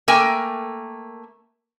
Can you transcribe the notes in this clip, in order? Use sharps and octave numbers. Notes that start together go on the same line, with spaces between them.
A3 A#3 A4 A#4 G5 G#5